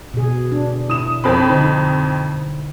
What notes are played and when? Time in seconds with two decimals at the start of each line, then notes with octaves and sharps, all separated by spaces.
0.14 B2 G#4
0.52 D4
0.90 E4 D#6 E7
1.24 F2 C4 B5
1.48 D3 D#4 C5